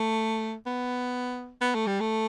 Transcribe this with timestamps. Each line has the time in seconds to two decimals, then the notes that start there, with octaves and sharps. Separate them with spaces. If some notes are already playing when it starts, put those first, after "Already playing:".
Already playing: A3
0.66 B3
1.61 B3
1.75 A3
1.87 G3
2.01 A3